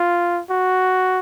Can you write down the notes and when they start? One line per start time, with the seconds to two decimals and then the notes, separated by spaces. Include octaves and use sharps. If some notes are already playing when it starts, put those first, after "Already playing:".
Already playing: F4
0.50 F#4